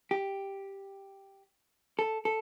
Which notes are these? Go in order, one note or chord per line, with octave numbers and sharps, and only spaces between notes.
G4
A4
A4